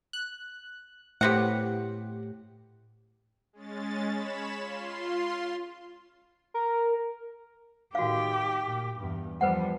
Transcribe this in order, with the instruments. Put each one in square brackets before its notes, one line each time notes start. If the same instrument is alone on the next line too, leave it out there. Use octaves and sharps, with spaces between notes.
[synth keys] F#6
[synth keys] A2 G4 [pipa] B3 C4 F#5
[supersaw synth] G#3 C#4 A6
C#5 B5 E7
F4 C6
[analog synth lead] A#4
[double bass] A2 D#3 [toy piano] F#4 F5 [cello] G4
[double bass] A#2
E2 G2
[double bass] E2 [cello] F3 G3 [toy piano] B4 C5 F#5